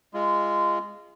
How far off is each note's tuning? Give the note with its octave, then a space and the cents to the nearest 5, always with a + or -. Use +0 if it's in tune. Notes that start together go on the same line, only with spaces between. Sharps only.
G#3 -15 F4 -25